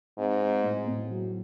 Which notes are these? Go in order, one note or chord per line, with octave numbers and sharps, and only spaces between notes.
G#2 C4
C4
A2
A2
F#3